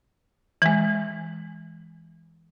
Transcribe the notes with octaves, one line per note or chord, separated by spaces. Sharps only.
E3 G#3